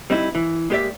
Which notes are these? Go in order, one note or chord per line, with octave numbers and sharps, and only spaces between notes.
G3 C4 D#4 E4
E3
G#3 A#3 G4 B4 D5 E5